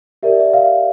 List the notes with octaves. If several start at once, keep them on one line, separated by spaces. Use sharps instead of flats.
G4 A#4 D5 E5
E5
F5